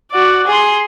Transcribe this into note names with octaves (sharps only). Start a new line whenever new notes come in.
F#4 D5
G#4 C6